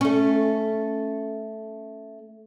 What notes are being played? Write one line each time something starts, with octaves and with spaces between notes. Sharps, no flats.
A3 C#4